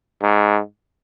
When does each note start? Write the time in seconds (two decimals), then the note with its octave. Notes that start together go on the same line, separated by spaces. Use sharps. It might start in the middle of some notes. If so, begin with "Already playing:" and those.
0.22 G#2